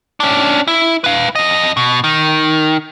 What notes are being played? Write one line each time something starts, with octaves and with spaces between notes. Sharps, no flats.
C#4 D4
E4
B4 F5
F2 D#5
B2
D#3